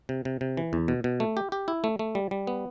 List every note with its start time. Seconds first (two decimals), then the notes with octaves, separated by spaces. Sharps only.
0.09 C3
0.25 C3
0.41 C3
0.57 E3
0.73 E2
0.88 B2
1.04 B2
1.20 A3
1.37 G4
1.52 G4
1.68 E4
1.84 A3
1.99 A3
2.15 G3
2.31 G3
2.47 B3